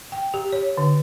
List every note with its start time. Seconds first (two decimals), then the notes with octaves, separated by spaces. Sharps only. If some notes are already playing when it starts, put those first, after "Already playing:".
0.12 G5
0.34 G4
0.52 C#5
0.77 D3